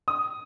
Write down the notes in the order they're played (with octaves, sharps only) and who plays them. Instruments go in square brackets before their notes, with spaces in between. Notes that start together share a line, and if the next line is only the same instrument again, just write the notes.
[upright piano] D#6